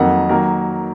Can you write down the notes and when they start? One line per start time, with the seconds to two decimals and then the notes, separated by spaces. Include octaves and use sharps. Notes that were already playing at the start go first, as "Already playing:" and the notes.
Already playing: F2 D#3 F#3 A#3 F#5
0.29 D#3 F#3 A#3 A#4